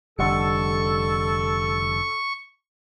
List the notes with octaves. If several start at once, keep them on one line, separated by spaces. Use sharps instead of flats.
F1 D3 G3 A4 F#5 C6 C#6